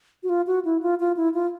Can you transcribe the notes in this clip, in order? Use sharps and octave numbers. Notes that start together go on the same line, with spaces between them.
F#4
F4
F#4
E4
F4
F4
E4
F4